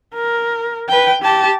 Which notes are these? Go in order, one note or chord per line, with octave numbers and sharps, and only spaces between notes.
A#4
B4 G5
G4 A5